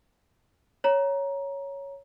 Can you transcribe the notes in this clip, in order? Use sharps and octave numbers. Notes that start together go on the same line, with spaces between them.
C#5 A#5